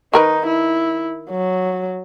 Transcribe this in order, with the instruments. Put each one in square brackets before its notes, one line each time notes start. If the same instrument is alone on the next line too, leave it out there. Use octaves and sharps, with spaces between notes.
[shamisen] D#3 A#4 B4 [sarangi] D#4
[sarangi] E4
F#3